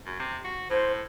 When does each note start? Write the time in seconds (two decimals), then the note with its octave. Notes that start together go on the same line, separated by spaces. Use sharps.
0.06 F#2
0.19 C3
0.44 F#4
0.70 A2 C5